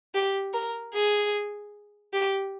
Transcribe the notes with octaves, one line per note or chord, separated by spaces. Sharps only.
G4
A#4
G#4
G4